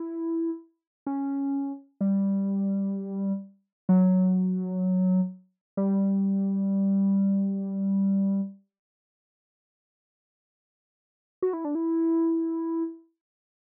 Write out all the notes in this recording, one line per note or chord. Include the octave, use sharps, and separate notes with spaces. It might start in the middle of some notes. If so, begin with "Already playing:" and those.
Already playing: E4
C#4
G3
F#3
G3
F#4
E4
D4
E4